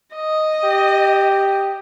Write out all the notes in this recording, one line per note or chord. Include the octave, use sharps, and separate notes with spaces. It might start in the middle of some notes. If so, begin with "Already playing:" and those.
D#5
G4